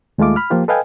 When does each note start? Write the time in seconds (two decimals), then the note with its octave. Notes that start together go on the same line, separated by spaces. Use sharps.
0.18 D#2 G#3 A3 F4 D6
0.36 B5 F6
0.50 F3 A#3 F4 G4
0.68 A4 B4 D#5 F5 G5 G#5